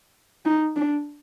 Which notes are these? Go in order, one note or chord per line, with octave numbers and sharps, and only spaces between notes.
D#4
D4